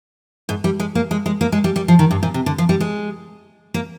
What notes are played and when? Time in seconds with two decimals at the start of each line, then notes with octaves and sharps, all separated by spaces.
0.49 G#2
0.64 G3
0.80 G#3
0.95 A#3
1.11 G#3
1.26 G#3
1.41 A#3
1.52 G#3
1.64 G3
1.76 G3
1.88 F3
1.99 D#3
2.11 G2
2.23 A#2
2.34 C3
2.46 D3
2.58 F3
2.69 G3
2.80 G#3
3.74 A#3